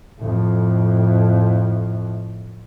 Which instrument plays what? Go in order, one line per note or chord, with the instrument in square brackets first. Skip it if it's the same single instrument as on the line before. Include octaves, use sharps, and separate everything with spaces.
[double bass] F2 A2